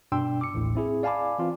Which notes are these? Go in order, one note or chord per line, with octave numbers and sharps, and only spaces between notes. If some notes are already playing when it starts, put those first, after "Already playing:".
G2 B2 D4 G5 C6 E6
D6 C#7
A1 D#2 A2
C4 E4 G#4
D5 F5 G#5 A5 B5 D6
E3 C4 F4